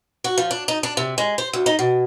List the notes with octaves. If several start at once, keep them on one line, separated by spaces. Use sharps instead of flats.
F#4
F3
D4
D#4
D4
C3
G#3
C5
D2
D#4
B2